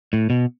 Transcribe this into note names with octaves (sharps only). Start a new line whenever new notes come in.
A2
B2